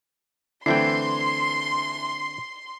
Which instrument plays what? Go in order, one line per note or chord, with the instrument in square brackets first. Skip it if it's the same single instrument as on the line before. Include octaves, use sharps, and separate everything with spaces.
[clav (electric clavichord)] D3 C4 G5 [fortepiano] E3 A3 E4 [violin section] C6 [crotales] C7